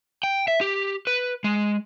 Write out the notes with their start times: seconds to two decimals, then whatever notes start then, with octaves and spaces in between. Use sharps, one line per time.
0.23 G5
0.48 E5
0.61 G4
1.07 B4
1.44 G#3